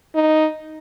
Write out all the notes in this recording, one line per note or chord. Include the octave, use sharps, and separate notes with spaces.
D#4